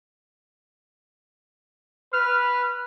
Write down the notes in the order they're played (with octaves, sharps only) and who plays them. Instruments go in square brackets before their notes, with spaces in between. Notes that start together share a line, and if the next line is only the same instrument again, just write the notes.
[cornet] B4 [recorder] F6